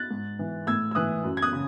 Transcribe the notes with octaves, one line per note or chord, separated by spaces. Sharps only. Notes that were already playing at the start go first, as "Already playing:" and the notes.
Already playing: F#6 A6
G#2
E3
A2 E6 G#6
E6
E3 D#6 F#6
F#2
G#6
D#6 F#6
C#3